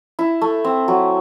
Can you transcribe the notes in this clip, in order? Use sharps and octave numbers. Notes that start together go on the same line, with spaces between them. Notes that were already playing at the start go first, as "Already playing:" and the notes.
E4
A3
C4
F#3